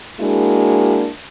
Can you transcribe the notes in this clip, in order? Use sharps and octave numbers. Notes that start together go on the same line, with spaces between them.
G#3 A#3 D4 E4 F#4 A#4